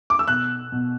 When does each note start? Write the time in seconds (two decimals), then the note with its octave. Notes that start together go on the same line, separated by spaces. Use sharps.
0.10 D6
0.19 E6
0.27 B2 F#6
0.72 B2